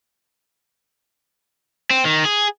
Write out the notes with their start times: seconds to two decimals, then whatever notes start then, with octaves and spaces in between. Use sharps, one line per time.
1.90 C4
2.05 D#3
2.25 G#4